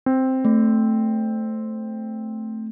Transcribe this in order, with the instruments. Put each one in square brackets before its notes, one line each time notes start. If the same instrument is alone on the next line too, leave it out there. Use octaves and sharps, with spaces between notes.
[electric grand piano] C4
[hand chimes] A3